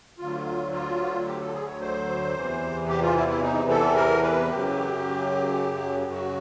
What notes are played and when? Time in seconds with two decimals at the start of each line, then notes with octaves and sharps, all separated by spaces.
0.19 D2 D3 F#3 F4
0.72 F4
1.26 G4
1.41 A4
1.53 G#4
1.67 C#5
1.80 C5
2.35 E2 C3 E3
2.88 G4
3.02 F4
3.15 E4
3.28 E4
3.42 D#4
3.69 A4
3.96 A#4
4.23 B4
4.50 F#2 C#3 F#3 G4
6.12 F#4